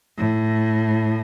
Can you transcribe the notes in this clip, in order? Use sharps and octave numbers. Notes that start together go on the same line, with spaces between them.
A2